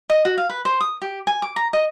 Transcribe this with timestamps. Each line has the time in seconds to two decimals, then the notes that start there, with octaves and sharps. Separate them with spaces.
0.10 D#5
0.25 F#4
0.38 F5
0.50 B4
0.65 C5
0.80 D#6
1.02 G4
1.27 G#5
1.42 D6
1.56 A#5
1.73 D#5